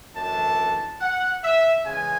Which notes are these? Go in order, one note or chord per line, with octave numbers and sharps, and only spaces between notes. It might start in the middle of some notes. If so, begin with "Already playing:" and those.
F#2 E3 A3 D4 A5
F#5
E5
C#3 E3 G#3 G#5